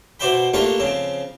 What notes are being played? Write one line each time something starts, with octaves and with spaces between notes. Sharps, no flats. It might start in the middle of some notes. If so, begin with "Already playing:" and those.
B2 C5 D5 E5 G5 B5
A3 A#3 D4 F4 G4 B4
C#3 F3 C4